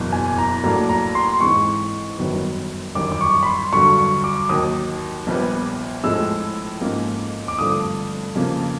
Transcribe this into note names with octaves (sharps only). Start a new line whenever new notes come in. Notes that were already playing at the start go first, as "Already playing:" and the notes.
Already playing: F#1 E2 B2
G#5
A#5
A2 F#3 A#3 D4 A#5
A#5
C6
G#2 E3 G#3 C4 C#6
G1 F#2 D#3 F#3 B3
G1 F#2 D#3 G3 D6
D6
C#6
B5
C6
G2 D3 F#3 C#6
C#6
D6
D#2 D#3 F#3 D#6
A#1 A#2 G3 B3
A2 F3 G#3 E6
G#2 F3 A#3 C#4
D6
G2 D3 F3 A3 C4 D#6
F2 C#3 F3 A#3